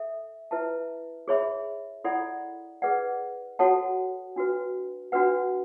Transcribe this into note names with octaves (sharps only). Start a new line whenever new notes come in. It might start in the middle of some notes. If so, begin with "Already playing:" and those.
Already playing: A4 E5
E4 B4 E5 A5
G#4 C#5 E5 B5
E4 A4 D5 F#5 B5
G#4 B4 D5 F#5
F#4 A4 C#5 F#5 A5
D4 F#4 B4
D4 F#4 B4 F#5